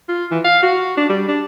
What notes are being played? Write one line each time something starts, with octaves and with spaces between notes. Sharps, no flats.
F4
E3
F5
F#4
D4
G3
D4